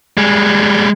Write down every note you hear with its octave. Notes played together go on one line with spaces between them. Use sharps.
G3 G#3